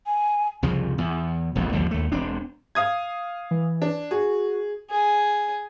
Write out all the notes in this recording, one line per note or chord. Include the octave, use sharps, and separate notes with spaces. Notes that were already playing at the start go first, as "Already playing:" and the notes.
G#5
C2 F2 C#3 F3
E2
E1 A#1 F2
G1 D#2 D3 F3
D#2 A3
E1 C4 D4
F5 D#6 G#6
E3
D4
F#4 G#4
G#4